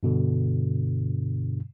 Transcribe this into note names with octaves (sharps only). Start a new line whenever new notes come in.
G2 B2 D3